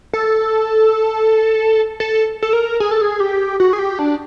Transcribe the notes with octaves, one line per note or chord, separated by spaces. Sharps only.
A4
A4
A4
A#4
G#4
A4
G#4
G4
F#4
G#4
G4
D4